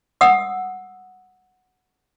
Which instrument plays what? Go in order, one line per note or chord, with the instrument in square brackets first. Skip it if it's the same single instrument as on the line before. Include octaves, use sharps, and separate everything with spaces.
[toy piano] F#5 D#6 E6